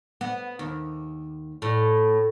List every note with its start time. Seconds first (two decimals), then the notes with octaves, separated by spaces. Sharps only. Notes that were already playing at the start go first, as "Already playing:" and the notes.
0.21 B3
0.59 D#2
1.62 A2